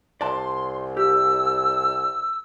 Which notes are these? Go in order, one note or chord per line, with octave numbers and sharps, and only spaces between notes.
C2 D5 A5 C6
G4 E6